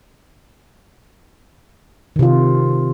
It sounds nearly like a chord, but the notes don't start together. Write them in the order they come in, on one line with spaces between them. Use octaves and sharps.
D#3 C3 F4